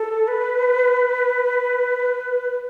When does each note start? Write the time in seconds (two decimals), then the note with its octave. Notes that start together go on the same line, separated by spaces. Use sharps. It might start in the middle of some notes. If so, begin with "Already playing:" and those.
Already playing: A4
0.28 B4